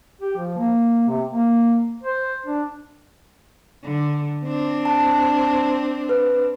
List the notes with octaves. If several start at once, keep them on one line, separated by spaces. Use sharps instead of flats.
G4
F3
A#3
C3
A#3
C5
D4
D3
C4 D4
A5
B4